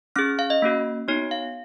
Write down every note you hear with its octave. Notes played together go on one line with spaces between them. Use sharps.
C#4 G#4 F6
F5
D#5
A#3 C#4 F#4
B3 D#4 F#4 C#5
F5